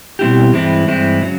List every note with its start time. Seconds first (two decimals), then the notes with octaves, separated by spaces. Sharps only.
0.19 B2 G3 C4 E4 G4
0.53 G2 E3 G#3 C4 E4
0.88 G2 E3 G#3 C4 E4
1.21 C#3 F#3